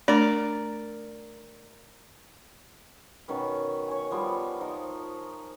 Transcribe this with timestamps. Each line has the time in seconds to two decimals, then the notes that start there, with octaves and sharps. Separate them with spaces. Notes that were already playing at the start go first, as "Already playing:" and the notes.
0.08 A3 D4 A#4 D5
3.28 B2 D#3 C#4 B4
3.88 C#5 G#5
4.11 F3 G3 B3
4.60 F3 D#4 A#4